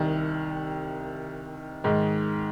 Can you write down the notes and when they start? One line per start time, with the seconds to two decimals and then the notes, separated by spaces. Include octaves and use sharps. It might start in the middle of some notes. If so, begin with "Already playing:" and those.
Already playing: C2 C3 D#3
1.84 G#2 D#3 G#3